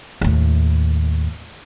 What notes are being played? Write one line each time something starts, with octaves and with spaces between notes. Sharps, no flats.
D#2 A2